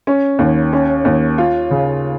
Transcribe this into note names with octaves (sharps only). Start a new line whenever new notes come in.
C#4
D#2
C#4
D#2
F4
C#3